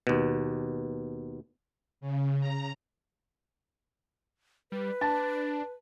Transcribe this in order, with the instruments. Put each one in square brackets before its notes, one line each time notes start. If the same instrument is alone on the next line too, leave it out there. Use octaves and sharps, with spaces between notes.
[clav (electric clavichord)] D#2 B2
[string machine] C#3
A#5
[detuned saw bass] G3 [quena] B4
[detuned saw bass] D4 [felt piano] A5